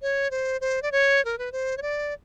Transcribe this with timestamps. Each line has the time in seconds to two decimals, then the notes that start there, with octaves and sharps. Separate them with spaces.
0.02 C#5
0.31 C5
0.61 C5
0.82 D5
0.92 C#5
1.25 A#4
1.39 B4
1.52 C5
1.77 C#5
1.82 D5